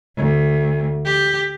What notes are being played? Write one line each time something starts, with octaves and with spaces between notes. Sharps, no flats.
D2
G4